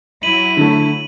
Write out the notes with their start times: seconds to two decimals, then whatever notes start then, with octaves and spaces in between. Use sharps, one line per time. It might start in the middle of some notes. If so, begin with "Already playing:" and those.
0.23 F#3 E4 D#7 F#7
0.57 D3 A3